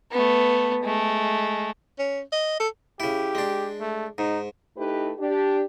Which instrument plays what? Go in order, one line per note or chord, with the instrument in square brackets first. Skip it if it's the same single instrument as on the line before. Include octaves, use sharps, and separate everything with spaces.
[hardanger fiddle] A3 B3
G#3 A3
[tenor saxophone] C#4
D#5
A4
[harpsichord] C#3 E4 [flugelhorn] G4
[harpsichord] G#3 D4
[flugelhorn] A3
[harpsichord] G#2 [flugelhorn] D#4
[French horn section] A3 D#4 E4 G4 B4
D4 G4